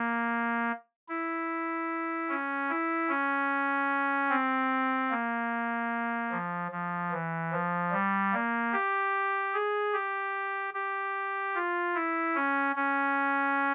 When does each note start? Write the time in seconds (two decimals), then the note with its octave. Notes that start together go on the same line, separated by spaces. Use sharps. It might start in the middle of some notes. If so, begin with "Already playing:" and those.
Already playing: A#3
1.09 E4
2.29 C#4
2.69 E4
3.09 C#4
4.30 C4
5.10 A#3
6.31 F3
6.71 F3
7.12 E3
7.52 F3
7.92 G3
8.32 A#3
8.72 G4
9.53 G#4
9.93 G4
10.74 G4
11.55 F4
11.94 E4
12.35 C#4
12.76 C#4